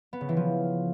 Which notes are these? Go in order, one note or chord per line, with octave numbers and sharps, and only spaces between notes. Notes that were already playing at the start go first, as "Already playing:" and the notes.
B3
C#3
E3
F3